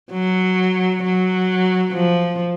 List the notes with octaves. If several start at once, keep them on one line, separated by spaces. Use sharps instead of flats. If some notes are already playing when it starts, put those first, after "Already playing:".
F#3
F#3
F3